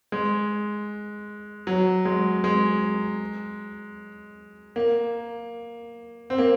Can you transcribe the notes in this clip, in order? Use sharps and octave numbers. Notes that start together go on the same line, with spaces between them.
G#3
F#3
G#3
G#3
A#3
C4
A#3